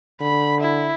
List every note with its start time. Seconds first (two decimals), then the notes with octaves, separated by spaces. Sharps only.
0.21 D3 B5
0.61 E4